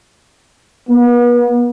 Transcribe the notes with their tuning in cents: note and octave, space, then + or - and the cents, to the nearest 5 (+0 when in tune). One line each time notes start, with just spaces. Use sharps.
B3 -40